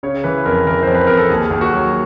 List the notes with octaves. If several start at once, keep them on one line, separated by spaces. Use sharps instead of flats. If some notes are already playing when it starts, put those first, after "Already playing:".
C#3 C#5
E3 B4
F2 A#4
E3 A#4
F2 C5
B4
F2 A#4
A4
D#2 G#4
D#2
F#4
F#3